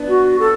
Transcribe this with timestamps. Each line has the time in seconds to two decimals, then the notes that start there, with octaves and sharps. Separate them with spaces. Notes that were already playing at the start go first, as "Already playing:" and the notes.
Already playing: B3 D4
0.08 F#4
0.39 A4